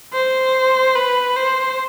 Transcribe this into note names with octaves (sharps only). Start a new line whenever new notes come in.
C5
B4
C5